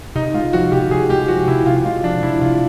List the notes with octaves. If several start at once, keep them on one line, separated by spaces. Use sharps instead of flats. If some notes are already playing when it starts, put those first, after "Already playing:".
C3 D#4
G#3 F4
F3 F#4
C3 G4
C3 G#4
G#3 G4
F3 F#4
C3 E4
C3 F4
G#3 F4
F3 D4
C3 E4
C3 F4